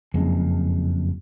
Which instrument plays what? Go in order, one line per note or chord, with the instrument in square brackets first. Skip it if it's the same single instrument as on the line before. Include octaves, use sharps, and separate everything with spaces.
[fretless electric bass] F#1 F2 G#3